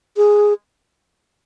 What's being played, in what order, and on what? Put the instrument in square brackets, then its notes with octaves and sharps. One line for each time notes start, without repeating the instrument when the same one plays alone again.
[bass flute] G#4